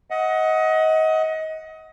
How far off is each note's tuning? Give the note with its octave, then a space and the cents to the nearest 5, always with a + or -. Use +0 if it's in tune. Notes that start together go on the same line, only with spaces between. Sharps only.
D#5 +25 F#5 +0